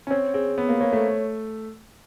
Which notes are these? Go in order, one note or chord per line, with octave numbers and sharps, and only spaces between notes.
C#4
C4 C#5
C4 G#4
B3 C#5
A#3
A#3 C#5
A3